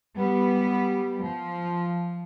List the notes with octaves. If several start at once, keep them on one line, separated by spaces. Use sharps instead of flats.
G3 B3
F3